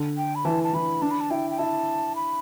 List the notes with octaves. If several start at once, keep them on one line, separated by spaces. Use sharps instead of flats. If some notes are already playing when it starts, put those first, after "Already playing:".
Already playing: D3
G5
B5
E3 A5
A5
E3 B5
D4 A5
B5
A5
E4 G5
G5
E4 A5
B5